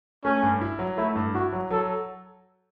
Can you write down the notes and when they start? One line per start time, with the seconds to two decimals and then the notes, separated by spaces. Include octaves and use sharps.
0.24 A3 C#4
0.43 G2
0.61 E4
0.79 F#3
0.97 A3 E4
1.16 G2
1.34 E4 F#4
1.53 F#3
1.70 F#3 A4